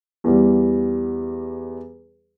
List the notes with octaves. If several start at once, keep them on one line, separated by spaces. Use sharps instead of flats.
E2 G3